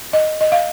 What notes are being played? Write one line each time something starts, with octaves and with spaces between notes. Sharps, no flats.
D#5
D#5
F5